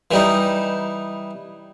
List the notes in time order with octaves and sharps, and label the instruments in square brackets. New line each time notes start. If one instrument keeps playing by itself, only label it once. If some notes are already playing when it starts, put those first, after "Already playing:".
[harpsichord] E3 G3 D#4